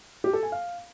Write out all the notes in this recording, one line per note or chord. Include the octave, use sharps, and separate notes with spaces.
G4
A4
G#5
F5